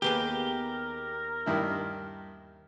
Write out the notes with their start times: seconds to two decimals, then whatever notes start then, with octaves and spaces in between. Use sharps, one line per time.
0.02 D#2 B3 G4 G#4 A#4
1.46 G2 D#3 E4